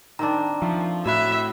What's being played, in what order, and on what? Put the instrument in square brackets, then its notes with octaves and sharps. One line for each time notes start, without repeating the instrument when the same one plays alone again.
[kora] D#3 C4 D4 [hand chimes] A#5
[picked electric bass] F3 [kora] A3
[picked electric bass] A2 [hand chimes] F#4 B5 F#6 [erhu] E5